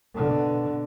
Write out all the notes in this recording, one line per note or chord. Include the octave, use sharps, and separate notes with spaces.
B2 D3